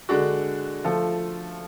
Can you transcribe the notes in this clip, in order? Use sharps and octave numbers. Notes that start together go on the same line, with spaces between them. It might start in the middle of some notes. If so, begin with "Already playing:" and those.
D3 G#3 D4 F#4
F3 A3 F4 A4